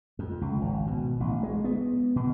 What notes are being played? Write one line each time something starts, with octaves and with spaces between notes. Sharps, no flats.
F2
C#2
G#1
B2
A1
G#3
B3
B2